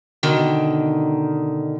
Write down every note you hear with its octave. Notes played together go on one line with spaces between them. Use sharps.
B2 D3 D#3